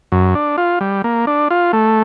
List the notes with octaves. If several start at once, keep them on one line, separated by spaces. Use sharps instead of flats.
F#2
D4
F4
G3
A#3
D4
F4
A3